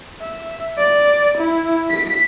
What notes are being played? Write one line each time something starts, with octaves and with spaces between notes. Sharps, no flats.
E5
D5
E4
B6